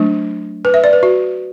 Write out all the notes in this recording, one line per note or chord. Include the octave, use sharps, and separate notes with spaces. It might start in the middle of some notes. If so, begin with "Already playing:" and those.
Already playing: F#3 A3 D4
B4
E5
D5
B4
F#4